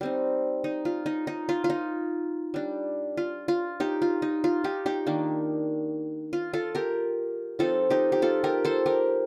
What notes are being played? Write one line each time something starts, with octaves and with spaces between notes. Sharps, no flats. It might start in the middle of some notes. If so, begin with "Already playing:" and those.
G3 C4 D#4
D#4
F4
D#4
D#4
F4
F4
D#4
G3 D4
F4
F4
D#4 G4
F4
D#4
F4
D#4 G4
D#4 G4
D#3 A#3 D4
F4
F4 A4
G4 A#4
F3 C4 D#4 F4 A4
D#4 G4
G4
F4 A4
G4 A#4
A4 C5
G4 A#4